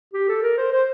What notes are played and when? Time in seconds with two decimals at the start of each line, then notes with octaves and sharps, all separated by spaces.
0.14 G4
0.29 A4
0.42 A#4
0.57 C5
0.72 C5